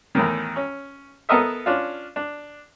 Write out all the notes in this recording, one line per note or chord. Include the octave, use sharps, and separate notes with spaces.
E2 A2 D#3
C#4
B3 A4 A#4 D#5 E5
C#4 D4 F4
D4